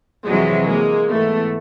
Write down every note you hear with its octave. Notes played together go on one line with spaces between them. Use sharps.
F2 C3 E3 F#3 G#3
G#3 A#3
G#2 E3 A3 B3